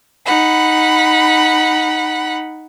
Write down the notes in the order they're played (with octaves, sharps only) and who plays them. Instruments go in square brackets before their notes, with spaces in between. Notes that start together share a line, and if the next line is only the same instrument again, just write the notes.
[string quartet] D#4 F#5 B5